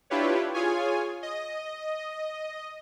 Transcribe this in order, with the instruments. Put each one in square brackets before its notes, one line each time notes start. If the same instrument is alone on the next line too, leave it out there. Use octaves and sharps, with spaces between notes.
[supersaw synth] D4 E4 F4 G4 B4 C#5
F4 G#4 C#5 G#5
D#5